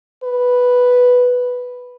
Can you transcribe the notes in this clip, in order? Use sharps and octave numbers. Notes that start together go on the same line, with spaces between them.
B4